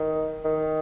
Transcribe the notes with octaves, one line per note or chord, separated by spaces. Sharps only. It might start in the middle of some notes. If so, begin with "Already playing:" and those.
Already playing: D#3
D#3